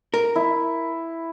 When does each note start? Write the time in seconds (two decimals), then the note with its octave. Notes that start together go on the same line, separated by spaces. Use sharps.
0.14 A#4
0.36 E4